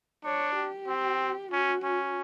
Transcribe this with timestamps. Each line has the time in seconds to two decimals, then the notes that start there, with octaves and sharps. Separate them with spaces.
0.25 D4 C#5
0.56 G4
0.88 C4
1.52 C#4 F#4
1.83 C#4